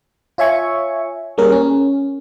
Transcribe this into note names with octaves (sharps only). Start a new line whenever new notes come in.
F4 C#5 E5 G#5 C#6
G3 A#3 C#4 G#4 A#4
C#4